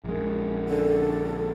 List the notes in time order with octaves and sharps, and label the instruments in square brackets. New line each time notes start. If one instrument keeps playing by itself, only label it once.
[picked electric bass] A#1 G#3 [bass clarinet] F#2
[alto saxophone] D3 [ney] A4